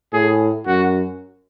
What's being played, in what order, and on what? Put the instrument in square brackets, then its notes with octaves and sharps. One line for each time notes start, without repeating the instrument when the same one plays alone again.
[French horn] A2 [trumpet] G#4
[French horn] F#2 [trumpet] F#4